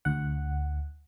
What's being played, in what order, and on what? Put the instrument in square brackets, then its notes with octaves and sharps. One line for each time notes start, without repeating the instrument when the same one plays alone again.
[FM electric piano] D2 F#5